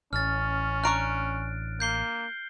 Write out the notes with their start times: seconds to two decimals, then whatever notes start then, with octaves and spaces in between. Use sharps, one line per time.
0.13 A1 C#4 F6 A6
0.84 D4 A#5 C#6 F#6 D7
1.80 A#3 G6 C7 G7